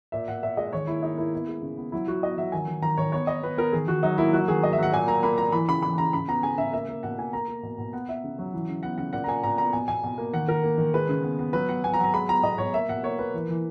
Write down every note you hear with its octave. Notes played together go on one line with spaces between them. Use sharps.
A#2 E5
A#2 F#5
A#2 E5
G#3 D#5
D#3 C#5
A#3 E4
A#3 D#4
A#3 E4
B3
G#3
C#3
B3
F#3 E4
F#3 F#4
B3 D#5
F#3 E5
D#3 G#5
D#3
D#3 A#5
D#3 C#5
B3 C#5
B3 D#5
B3 B4
B3 A#4
D#3 G#4
D#3 F#4
F#3 D#4
A#3 E4
F#3 F#4
D#3 G#4
F#3 D#5
E5
F#3 F#5
A#2 G#5
A#3 A#5
A#3 B5
A#3 A#5
E3 B5
C#3 B5
E3 B5
C#3 A#5
C#3 B5
B3 A#5
C#3 G#5
C#3 E5
A#3 E5
A#3
B2 F#5
A#3 G#5
A#3 A#5
A#3
B2
B2
B3 F#5
B3 E5
C#3
F#3
E3
C#3
B3 F#5
C#3 F#5
A#2 F#5
A#5
A#2 G#5
A#2 A#5
B3 A#5
B2 G#5
B2 G#5
B2
A#3
D#3 F#5
D#3 A#4
A#3
D#3
G#3 B4
C#3
B3
B3
F#3 B4
B3 F#5
B3 G#5
A#5
F#3
A#5
G#3 B5
B3 A#5
B2 D#5
B2 C#5
A#3 E5
B2 F#5
A#3 C#5
A#3 B4
E3
E3